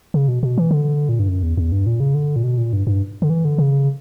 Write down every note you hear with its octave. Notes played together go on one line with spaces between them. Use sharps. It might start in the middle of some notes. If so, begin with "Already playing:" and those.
C#3
B2
B2
E3
D3
A#2
G2
F#2
E2
E2
G2
A#2
C#3
D3
A#2
B2
A#2
G2
G2
D3
E3
D3
C#3